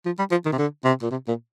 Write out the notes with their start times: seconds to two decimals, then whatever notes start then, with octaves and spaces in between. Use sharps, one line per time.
0.06 F3
0.18 G3
0.31 F3
0.45 D#3
0.52 C3
0.58 D3
0.84 C3
1.02 A#2
1.11 C3
1.28 A#2